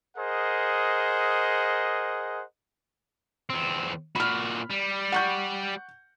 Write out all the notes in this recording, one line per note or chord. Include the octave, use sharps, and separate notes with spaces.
G#4 A#4 C5 D#5 F#5
E2 C4
A#2 F#4 B5 F6
G3
F#5 C#6 G6